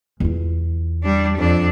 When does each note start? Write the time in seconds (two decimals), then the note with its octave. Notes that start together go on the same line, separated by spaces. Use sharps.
0.20 E2 F4
1.03 G3 D4
1.37 F2 D4